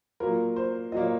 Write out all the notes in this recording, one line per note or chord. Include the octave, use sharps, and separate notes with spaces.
A#2 F#3 A#3 A#4
C5
A#2 F#3 A#3 D#5
C#5